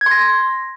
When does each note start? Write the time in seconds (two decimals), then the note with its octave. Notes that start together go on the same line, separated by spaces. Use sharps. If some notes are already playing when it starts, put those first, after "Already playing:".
0.01 G#6
0.06 C6
0.11 A#6